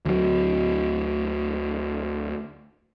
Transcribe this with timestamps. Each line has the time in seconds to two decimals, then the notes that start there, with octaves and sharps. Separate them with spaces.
0.05 D2 F#3